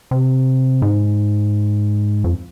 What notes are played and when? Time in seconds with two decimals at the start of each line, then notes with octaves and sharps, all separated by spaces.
0.11 C3
0.82 G#2
2.24 F2